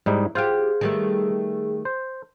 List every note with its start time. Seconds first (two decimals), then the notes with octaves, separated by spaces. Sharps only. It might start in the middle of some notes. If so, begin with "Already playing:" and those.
0.06 G#2 G3 D#4 E4
0.35 F4 G4 G#4 C5 F5 F#5
0.81 D#3 G3 A3
1.85 C5